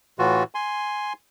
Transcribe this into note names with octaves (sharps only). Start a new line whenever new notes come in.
A2 E3 F4 F#4
G#5 C6